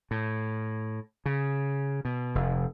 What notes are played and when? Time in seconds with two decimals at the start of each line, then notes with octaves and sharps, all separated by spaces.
0.11 A2
1.26 C#3
2.05 B2
2.35 F1